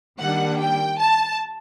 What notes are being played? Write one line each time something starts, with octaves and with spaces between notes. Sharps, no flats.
D#3 G3 A#3 D4 F#5
G5
A5